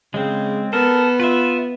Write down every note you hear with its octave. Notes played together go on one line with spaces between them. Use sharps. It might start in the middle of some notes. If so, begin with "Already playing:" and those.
C#3 G#3 C4
B3 A4 A#4
F4 B4 E5